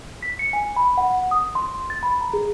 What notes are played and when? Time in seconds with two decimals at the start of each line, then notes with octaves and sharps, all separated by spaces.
0.22 B6
0.39 C#7
0.53 G#5
0.76 B5
0.97 F#5
1.31 D#6
1.55 C6
1.90 A6
2.03 B5
2.21 A#5
2.33 G#4